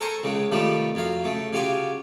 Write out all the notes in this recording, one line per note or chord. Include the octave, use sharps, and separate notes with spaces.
A4 A#4 C5 G#5 A#5 C#6
C#2 C#3 G#3
C3 D#3 F3 G3 A3
F2 F#3 F5
C#3 A3
C#3 F#3 F4 G4 G#5